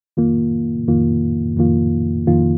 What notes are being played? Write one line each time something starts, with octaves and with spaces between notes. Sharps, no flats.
F2 D#3 A#3 F4
F2 D#3 A#3 F4
F2 D#3 A#3 F4
F2 D#3 A#3 F4